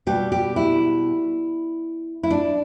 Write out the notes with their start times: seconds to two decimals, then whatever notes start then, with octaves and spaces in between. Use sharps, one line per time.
0.07 B2 G3 G4
0.32 G4
0.56 E4
2.23 E4
2.31 D4